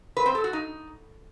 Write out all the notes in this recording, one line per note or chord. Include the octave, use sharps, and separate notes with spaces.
B4
C4
A4
F#4
D#4